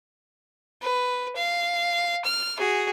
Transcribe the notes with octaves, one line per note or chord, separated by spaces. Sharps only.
B4
F5
F6
F#4 G#4